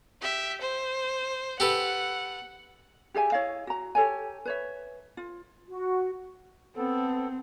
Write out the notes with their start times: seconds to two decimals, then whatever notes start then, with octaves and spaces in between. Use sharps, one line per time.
0.21 G4 E5
0.62 C5
1.60 G4 A4 B4 F#5
3.14 G4 G#4 E5 G#5
3.32 E4 C#5 D#5 F5
3.67 F#4 A#5
3.95 G4 A4 C#5 G#5
4.45 B4 C#5 E5
5.17 F4
5.68 F#4
6.77 B3 C4 A4